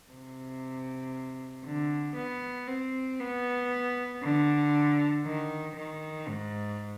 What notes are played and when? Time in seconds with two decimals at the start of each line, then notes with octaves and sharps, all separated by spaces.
0.11 C3
1.66 D3
2.17 B3
2.68 C4
3.20 B3
4.23 D3
5.25 D#3
5.77 D#3
6.28 G#2